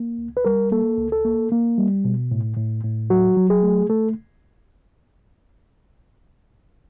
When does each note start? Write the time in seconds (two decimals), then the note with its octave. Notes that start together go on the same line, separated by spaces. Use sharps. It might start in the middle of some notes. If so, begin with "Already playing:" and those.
Already playing: A#3
0.18 C#2
0.37 B4
0.45 G3 A#4
0.72 A#3 A4
0.98 C#2
1.12 A4
1.25 A#3
1.52 A#3
1.78 G3
2.05 B2
2.31 A2
2.57 A2
2.84 A2
3.10 F#3 F#4
3.37 F#3
3.50 G#4
3.63 A3
3.89 A3 A4